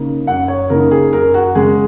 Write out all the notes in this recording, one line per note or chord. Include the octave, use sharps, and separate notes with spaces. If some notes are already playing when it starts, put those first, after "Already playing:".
Already playing: C#3 A#3 D#4
F#2 F#5
C#5
C#3 A#3 D#4 A#4
G#4
F#2 A#4
F#4
C#3 G#3 G#4